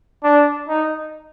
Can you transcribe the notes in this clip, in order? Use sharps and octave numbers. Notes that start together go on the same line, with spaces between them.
D4
D#4